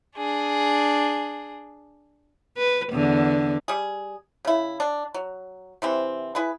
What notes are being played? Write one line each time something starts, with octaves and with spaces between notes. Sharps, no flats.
D4 G#4
B4
E2 D3
G3 G#4
C#3 E4
D4
F#3
C3 E3 C4
E4 G#4 B4